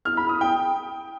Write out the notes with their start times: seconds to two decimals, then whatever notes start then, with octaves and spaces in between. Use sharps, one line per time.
0.05 F6
0.17 B5
0.29 D#6
0.41 G5